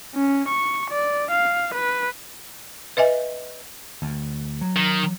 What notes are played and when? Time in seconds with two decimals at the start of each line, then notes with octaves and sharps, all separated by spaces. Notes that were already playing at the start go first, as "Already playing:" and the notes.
0.15 C#4
0.49 C#6
0.90 D5
1.31 F5
1.75 B4
2.97 B4 D#5 E5 G#5
4.02 D2
4.61 F#3
4.77 D#3